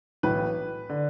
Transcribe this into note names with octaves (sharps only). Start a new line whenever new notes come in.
B1 A2 E3 B4
D3